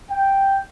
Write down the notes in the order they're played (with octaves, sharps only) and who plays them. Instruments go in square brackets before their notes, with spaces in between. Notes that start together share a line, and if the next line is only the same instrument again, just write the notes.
[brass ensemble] G5